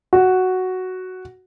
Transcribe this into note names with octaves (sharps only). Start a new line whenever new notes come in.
F#4